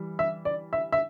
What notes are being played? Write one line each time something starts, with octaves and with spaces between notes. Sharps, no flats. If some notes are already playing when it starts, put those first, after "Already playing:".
Already playing: E3 G3
E5
D5
E5
E5